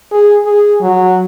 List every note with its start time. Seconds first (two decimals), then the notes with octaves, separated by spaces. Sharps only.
0.12 G#4
0.45 G#4
0.82 F#3